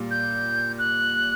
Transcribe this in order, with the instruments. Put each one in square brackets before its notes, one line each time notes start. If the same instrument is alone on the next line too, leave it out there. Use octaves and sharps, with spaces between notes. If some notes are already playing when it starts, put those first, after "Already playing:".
Already playing: [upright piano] A#2 G3
[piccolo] G6
F#6